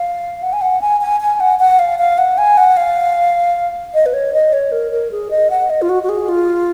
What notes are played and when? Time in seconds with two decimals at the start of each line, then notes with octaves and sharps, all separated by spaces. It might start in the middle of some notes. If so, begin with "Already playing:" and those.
Already playing: F5
0.43 F#5
0.53 G#5
0.61 F#5
0.81 G#5
1.01 G#5
1.20 G#5
1.40 F#5
1.60 F#5
1.79 F5
1.99 F5
2.18 F#5
2.38 G#5
2.57 F#5
2.77 F5
3.94 D#5
4.06 B4
4.14 C#5
4.33 D#5
4.53 C#5
4.72 A#4
4.92 A#4
5.11 G#4
5.31 D#5
5.50 F#5
5.70 D#5
5.82 F4
5.89 F#4
6.03 F#4
6.09 G#4
6.29 F4